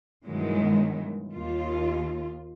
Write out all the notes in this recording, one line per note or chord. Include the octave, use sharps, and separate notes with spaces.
G2 B2 D#3 E3 F#3 G#3
D#2 F4